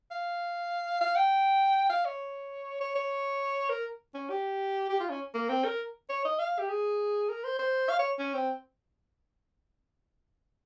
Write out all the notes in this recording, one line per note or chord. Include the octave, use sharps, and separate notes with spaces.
F5
F5
G5
F5
C#5
C#5
C#5
A#4
C#4
G4
G4
F4
C#4
A#3
C4
A#4
C#5
D#5
F5
G4
G#4
A#4
C5
C5
F5
C#5
C#4
C4